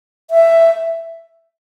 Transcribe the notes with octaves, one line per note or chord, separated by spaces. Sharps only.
E5